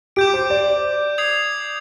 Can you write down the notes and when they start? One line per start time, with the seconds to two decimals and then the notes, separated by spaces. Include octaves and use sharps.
0.16 G4 D6 G6 D7
0.34 C5
0.50 D5
1.18 D#6 G#6 C7 F7